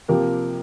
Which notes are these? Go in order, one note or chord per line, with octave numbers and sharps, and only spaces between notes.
C3 F3 A#3 G4 A#4